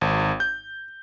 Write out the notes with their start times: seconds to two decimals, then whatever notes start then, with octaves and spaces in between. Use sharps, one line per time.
0.01 G#1
0.40 G6